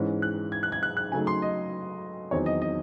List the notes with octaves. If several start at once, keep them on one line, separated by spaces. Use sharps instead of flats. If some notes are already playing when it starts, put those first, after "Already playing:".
Already playing: G#2 E3 G#3 C#4
F#6
G#6
F#6
G#6
F#6
F#6
C#3 F#3 A3 D#4 G#5
C6
D#5
E2 D#3 F#3 C4 D#4 C#5
D#5
D#5